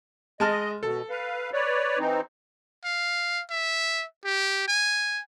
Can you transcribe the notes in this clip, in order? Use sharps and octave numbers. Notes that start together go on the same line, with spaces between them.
G#3 D#5 A5 F6
B2 A4
B4 F5
B4 C#5 D5
E3 C4 D#4
F5
E5
G4
G#5